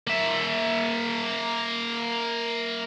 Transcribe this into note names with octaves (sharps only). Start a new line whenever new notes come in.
A#3 E5